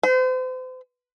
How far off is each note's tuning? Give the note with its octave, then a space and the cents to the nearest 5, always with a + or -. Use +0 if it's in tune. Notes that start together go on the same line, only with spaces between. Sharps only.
C5 -40